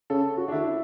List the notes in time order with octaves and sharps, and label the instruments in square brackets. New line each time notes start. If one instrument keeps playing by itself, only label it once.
[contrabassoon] C#3 [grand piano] A4
[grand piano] F#4
D4
[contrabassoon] D3 [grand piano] E4